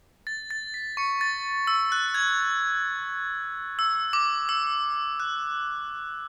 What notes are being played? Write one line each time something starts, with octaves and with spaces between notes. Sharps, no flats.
A6
A6
B6
C#6 C#7
A6
E6
F#6
G#6
E6
D6
E6
F#6